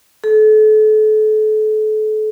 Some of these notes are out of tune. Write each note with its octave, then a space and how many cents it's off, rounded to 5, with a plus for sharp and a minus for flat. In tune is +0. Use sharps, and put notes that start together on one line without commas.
A4 -35